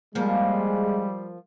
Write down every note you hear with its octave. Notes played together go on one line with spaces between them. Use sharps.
F3 G3 G#3 A#3